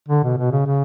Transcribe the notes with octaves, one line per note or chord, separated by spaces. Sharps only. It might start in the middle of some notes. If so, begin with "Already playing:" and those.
D3
B2
B2
C#3
C#3